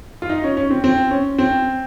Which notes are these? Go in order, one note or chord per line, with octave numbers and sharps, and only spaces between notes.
F4
D#4
C#4
C#4
C4
C4
C#4
C4